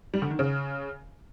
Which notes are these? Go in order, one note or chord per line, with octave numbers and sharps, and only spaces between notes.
G3
D3
D#3
C#3